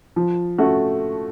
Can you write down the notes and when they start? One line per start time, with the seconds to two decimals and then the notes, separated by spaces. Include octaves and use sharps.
0.16 F3
0.58 A3 C#4 F#4